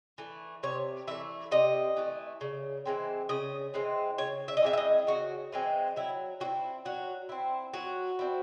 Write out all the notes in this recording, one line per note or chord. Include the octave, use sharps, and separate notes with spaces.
E3 A3
C3 C#5
E3 A3 E5
C3 D#5
E3 A3
C#3
E3 G#3 C4
C#3 D#5
E3 G#3 C4
C#3 C#5
E5
D#5
E3 G#3 C4 E5
E5
D#5
C#3 F#4
E3 G#3 C4
F#3 E4
C4 E4 F#4
F#3 F#4
C4 E4
F#3 F#4
C4 E4